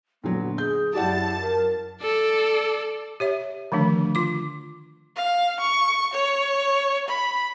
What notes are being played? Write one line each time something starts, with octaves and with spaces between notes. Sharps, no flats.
A#2 D3 F#3 B3
G#4 G6
F#2 E4 G4 D5 F#5 A5
A#4
A4 D5
G4 C#5 E5
D3 D#3 F3 A3 D4
F4 D6
F5
C#6
C#5
B5